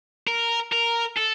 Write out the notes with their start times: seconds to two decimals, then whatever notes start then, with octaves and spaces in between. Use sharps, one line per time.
0.27 A#4
0.73 A#4
1.17 A4